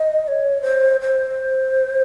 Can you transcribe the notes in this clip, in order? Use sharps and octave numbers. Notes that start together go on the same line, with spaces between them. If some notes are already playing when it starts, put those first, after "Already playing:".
Already playing: D#5
D#5
C#5
C5
C5